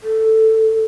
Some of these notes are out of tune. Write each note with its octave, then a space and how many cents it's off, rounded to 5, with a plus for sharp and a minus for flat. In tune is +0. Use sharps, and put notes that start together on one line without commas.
A4 +5